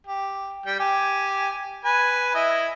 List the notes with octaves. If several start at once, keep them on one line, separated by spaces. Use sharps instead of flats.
G4
G3 G5
G4 G#5
B4 G#5
E4 D#5